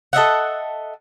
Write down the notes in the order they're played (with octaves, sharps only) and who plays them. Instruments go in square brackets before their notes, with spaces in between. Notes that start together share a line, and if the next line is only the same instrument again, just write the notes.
[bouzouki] A4 D#5 E5 F#5